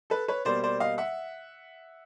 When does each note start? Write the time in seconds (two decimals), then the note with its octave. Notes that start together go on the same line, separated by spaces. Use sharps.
0.10 A4 B4
0.28 B4 C#5
0.45 B2 G3 A#3 C5 D5
0.63 C5 D5
0.80 D#5 F5
0.98 E5 F#5